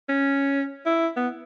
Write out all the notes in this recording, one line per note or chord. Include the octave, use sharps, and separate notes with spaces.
C#4
E4
B3